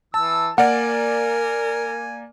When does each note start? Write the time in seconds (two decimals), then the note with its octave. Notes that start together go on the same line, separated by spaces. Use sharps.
0.14 E3 A5 E6
0.58 A#3 A#4 D5 F#5 G#5